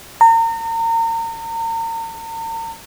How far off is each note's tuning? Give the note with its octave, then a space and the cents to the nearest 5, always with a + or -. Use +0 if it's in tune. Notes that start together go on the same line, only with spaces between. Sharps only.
A#5 -35